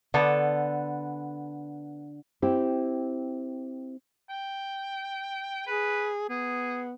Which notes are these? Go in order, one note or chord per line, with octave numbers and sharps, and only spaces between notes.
D3 B3 A4 D5
C4 E4 G4
G5
G#4 B4
B3 G#4